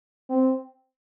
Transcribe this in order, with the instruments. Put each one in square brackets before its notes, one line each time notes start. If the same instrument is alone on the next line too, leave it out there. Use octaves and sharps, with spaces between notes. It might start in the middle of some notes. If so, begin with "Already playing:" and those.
[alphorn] C4